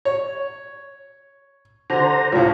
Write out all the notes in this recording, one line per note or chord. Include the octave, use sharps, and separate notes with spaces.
C#5
D3 C5 A#5
C#2 A2 F4